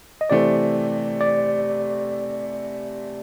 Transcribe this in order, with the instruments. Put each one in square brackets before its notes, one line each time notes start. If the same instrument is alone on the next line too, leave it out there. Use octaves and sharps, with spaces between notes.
[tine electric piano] D#5
[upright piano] C3 E3 A3 C4 [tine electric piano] D5
[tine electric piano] D5